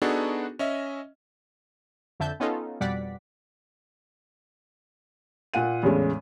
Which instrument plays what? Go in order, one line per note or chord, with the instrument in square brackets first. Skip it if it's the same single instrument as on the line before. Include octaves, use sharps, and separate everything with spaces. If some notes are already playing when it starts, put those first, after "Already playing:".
[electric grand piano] B3 D4 D#4 F#4 G#4 A4
C#4 D#5 E5
[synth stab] F2 D3 E5 A5 G6
B3 C#4 D#4 F4 A4
F2 B2 G3 D5 F#5 B6
[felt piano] A#2 F#5 D#7
E2 A2 C#3 G#3